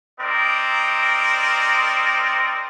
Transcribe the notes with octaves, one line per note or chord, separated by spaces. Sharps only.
C4 D#4 A#4 D5